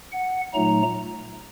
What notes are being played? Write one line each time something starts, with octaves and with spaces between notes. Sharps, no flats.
F#5
A#2 F#3 A3 D#4 A#5